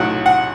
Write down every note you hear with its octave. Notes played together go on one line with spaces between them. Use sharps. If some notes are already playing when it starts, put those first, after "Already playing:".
Already playing: B1 A2 F#3 F#5
F#5